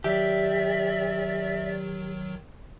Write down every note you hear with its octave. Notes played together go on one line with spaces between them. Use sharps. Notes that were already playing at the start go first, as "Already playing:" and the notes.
D#3 F#3 G4 D5 E5